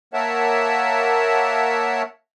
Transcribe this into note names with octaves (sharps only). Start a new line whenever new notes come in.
A#3 A#4 C#5 E5 F#5 A5